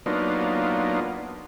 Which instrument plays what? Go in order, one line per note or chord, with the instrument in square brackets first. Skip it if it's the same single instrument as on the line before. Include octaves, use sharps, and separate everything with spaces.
[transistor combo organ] F#3 A#3 B3 D4 D#4 F4